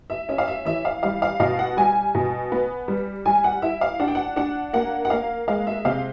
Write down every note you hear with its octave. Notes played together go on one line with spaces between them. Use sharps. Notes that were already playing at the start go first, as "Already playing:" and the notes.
E5
C#4 E5
F5
E5
E3 E5
F5
G3 F5
F5
B2 F5
F#5
G3 G#5
B2
B3
G3
G3 G#5
F#5
E4 E5
F5
D4 F#5
G5
F#5
D4 F#5
A#3 F#5
F#5
A#3 F5
G#3 F5
E5
C3 F5